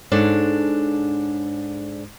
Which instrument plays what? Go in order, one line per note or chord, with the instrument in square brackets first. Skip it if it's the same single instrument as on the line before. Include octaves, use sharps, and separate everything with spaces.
[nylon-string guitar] G#2 D4 A4 C#5 D5